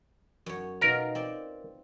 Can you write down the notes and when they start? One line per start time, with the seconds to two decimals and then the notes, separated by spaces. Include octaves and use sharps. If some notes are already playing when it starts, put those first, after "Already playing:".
0.46 F#2 C#5
0.81 B2 D#4 F4 A#4
1.15 C4 D5